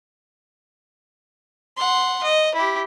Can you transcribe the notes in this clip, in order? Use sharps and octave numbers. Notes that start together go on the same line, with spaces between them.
F#5 C6
D#5
E4 G4